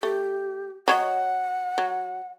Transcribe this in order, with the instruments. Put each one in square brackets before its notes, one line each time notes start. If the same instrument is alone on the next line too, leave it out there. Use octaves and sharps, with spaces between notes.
[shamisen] A3 [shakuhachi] G4
[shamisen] F#3 C#5 D#5 [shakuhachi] F#5
[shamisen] F#3